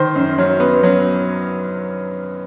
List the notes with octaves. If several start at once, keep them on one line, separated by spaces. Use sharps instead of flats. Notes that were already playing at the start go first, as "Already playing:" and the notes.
Already playing: D#3 C5
F#2
F#3
B3
F#3